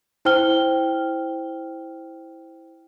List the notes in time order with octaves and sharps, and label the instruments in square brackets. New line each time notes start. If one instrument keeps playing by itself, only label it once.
[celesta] E4 C5 G5 F6 G7